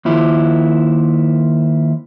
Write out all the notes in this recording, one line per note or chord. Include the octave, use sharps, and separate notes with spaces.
D#2 F3 E4